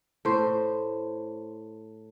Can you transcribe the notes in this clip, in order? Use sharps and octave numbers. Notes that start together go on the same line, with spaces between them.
A2 C5